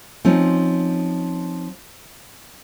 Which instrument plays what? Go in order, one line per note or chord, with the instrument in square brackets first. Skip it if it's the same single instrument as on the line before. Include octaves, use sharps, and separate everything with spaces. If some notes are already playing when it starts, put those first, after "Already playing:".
[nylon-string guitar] F3 C4 C#4 D#4